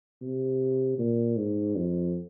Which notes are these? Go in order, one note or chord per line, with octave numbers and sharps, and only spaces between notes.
C3
A#2
G#2
F2